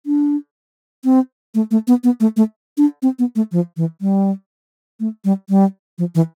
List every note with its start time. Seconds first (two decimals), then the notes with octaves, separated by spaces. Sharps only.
0.06 D4
1.04 C4
1.55 A3
1.71 A3
1.88 B3
2.04 B3
2.20 A3
2.37 A3
2.77 D4
3.02 C4
3.19 B3
3.36 A3
3.52 F3
3.77 E3
4.01 G3
5.00 A3
5.25 G3
5.49 G3
5.98 F3
6.15 E3